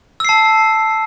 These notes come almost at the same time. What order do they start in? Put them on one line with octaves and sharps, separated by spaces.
E6 C7 A5